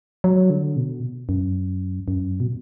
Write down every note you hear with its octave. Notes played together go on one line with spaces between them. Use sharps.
F#3
D3
B2
F#2
F#2
B2